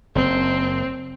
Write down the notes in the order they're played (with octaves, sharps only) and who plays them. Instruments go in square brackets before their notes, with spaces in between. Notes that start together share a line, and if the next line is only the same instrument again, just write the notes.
[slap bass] F#1 [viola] C4